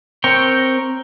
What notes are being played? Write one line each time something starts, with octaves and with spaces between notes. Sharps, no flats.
C4 A#4 C#5 G5